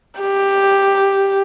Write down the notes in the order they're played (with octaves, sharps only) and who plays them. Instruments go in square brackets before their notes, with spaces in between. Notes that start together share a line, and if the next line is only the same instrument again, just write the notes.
[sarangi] G4